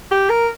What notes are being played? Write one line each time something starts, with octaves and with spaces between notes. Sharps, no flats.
G4
A#4